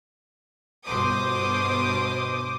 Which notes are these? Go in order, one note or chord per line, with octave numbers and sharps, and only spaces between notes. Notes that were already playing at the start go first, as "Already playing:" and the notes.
G1 B2 C5 D6 D#6